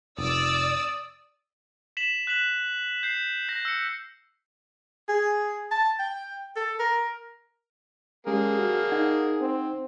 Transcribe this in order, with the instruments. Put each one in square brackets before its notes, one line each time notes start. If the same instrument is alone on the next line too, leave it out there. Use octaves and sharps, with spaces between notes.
[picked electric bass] F1 [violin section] D5 E6 [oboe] D#6
[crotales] B6 E7 F#7
F#6 B6 E7 F#7
G6 C7
G6 A#6
E6 C#7
[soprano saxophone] G#4
A5
G5
A4
A#4
[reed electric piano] G#3 C#4 G4 [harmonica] A#3 G#4
[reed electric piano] F#4 F#5 F6
D#4 F#5 G#6
[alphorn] C4